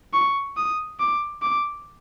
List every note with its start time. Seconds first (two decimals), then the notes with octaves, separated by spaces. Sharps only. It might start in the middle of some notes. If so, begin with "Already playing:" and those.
0.13 C#6
0.56 D#6
1.00 D6
1.42 D6